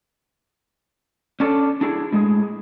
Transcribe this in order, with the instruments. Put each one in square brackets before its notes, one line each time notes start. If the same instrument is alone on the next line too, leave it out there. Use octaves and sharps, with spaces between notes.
[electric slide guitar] C#4 D4 A4
D4 E4 G#4
A2 G#3 G#4